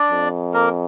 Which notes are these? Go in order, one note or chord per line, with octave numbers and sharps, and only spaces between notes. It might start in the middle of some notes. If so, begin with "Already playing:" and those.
Already playing: D4 D5
F2
A#3 A#4